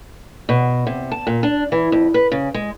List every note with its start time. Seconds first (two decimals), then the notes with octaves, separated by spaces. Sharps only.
0.49 B2
0.87 C3
1.11 A5
1.27 A#2
1.43 D4
1.72 E3
1.92 F2
2.14 B4
2.32 C#3
2.54 G#3